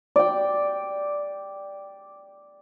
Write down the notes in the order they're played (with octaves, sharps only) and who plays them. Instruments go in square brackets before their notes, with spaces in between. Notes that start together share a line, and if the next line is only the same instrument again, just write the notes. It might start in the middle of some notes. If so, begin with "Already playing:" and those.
[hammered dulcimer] D5 G5